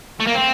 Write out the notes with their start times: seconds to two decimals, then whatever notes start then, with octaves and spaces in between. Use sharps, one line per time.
0.20 A3
0.27 A#3
0.34 C4